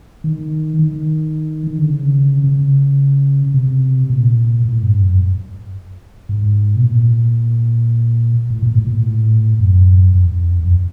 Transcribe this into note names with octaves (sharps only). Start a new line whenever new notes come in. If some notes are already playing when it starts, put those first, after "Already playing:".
D#3
D#3
D#3
D3
C#3
C#3
C3
A#2
A2
G2
F#2
G#2
B2
A#2
A2
A#2
A2
A#2
A2
F#2
F2
F2